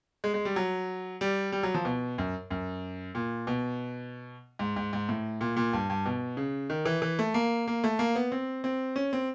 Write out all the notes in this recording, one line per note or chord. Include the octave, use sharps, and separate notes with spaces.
G#3
G#3
G3
F#3
G3
G3
F#3
F3
B2
F#2
F#2
A#2
B2
G#2
G#2
G#2
A2
A#2
A#2
G2
G2
B2
C#3
D#3
E3
E3
A3
A#3
A#3
A3
A#3
B3
C4
C4
C#4
C4